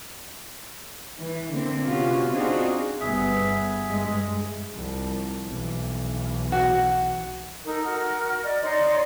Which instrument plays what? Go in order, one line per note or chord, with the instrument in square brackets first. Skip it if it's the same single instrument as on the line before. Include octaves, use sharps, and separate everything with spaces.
[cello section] E3
D3 A#3 C4
C3 B3 C#4 F4 F#4
C4 D4 D#4 F4 F#4 G#4
[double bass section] G1 B3 [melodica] G#4 E5
[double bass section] G2 G#3
[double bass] C2 F3
B1 E3
[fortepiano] F#4
[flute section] D#4 A4 A#4
F#4 A#4 F6
D5 D#5
D#4 C#5 D5 C6